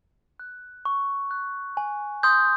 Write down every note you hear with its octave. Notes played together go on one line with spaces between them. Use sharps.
F#6
C#6
F#6
G#5
C6 D#6 G6